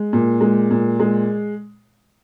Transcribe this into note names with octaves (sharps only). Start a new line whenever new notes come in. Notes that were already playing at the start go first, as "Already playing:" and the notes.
Already playing: G#3
A#2
G#3
A#2
G#3